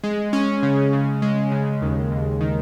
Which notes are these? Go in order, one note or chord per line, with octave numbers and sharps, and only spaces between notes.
G#3
C#4
C#3
C#3
G#3
C#3
D#2
D#2
D#3